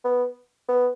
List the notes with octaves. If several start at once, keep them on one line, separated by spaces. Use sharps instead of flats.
B3
B3